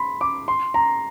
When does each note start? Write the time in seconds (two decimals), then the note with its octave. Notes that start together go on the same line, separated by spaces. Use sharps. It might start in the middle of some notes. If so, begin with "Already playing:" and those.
Already playing: B5 C6
0.21 D6
0.48 C6
0.74 A#5